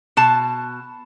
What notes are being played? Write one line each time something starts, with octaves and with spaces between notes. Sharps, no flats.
B2 A5